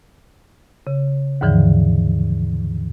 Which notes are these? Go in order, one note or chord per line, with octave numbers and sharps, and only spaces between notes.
C#3
D#2 G#2 D3 E3 F3